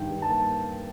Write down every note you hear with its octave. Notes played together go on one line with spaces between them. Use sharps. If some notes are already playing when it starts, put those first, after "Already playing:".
Already playing: G2 D#3 G5
G2
A5
A#3